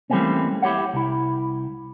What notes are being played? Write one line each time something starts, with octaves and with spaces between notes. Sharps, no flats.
E3 G3 A3 A#3 C4 C#4
E4 G4 C#5 F#5
C2 E4